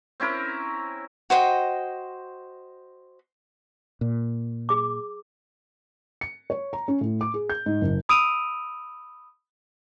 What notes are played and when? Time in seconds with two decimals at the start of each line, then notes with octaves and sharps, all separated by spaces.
0.20 C4 C#4 E4 A#4
1.30 F#4 C5 D#5 G5
4.01 A#2
4.69 G#4 D6
6.21 C#7
6.50 C#5
6.73 A#5
6.88 C#4
7.01 A2
7.21 D6
7.34 G#4
7.49 G6
7.66 G#2
7.81 F#1
8.09 B5 D#6 E6 D7 D#7 F7